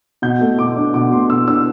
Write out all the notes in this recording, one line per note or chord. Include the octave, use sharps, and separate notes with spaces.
B2 G6
A3
B2 D6
D4
B2 D6
A3 C6
B2 E6
D4 E6